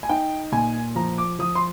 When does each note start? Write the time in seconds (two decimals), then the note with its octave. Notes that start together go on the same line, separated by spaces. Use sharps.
0.03 G#5
0.09 D#4 G5
0.52 A#2 G#5
0.95 F3 A#5
1.18 D6
1.39 F3 D#6
1.55 C6